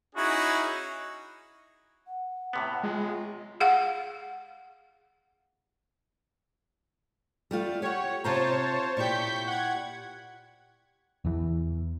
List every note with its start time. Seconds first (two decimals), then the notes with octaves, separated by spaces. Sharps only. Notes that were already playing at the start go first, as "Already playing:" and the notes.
0.16 C#4 D#4 E4 F#4 G#4
2.07 F#5
2.53 A2 C3 B3
2.83 G#3 F4
3.60 G#4 F5 F#5
7.51 G3 A3 F4
7.82 G4 C#5 F#5
8.24 C3 F4 C5 C#5 A5 A#5
8.97 A#2 E4 G4 C#6 G6 B6
9.47 F#5 G#6
11.25 E2 E3